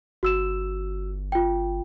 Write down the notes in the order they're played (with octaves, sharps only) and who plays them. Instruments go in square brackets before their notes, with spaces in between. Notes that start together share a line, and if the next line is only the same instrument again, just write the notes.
[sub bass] G1 [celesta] F#4 E6 E7
[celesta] F4 G5